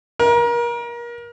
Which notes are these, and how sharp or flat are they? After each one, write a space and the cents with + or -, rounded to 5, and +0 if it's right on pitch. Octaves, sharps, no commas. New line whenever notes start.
A#4 +30